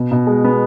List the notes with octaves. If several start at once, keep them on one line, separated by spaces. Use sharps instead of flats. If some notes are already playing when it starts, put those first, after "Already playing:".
Already playing: B2
B2
G#3
B3